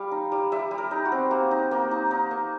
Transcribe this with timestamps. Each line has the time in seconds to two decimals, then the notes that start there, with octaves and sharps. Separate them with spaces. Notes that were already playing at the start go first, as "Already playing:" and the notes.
Already playing: G3 F5
0.12 D#4
0.32 G3
0.52 G3 E5
0.71 G3
0.78 A#4
0.91 D#4
1.05 F#4
1.12 C4
1.31 A#3
1.51 D#4
1.71 A#3
1.91 D#4
2.11 D#4
2.31 A#3